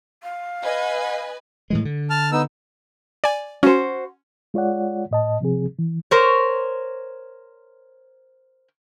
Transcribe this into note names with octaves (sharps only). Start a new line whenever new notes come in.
F5
B4 D#5 G#5
A2 E3 G#3
D3
A5 F6
B3 D#4 E6
D5 G#5
C#4 F#4 C5
G#3 F4 C#5 D5 F#5
A2 D#5 A5
C3 F3 C4 G#4
E3
A#4 C5 C#5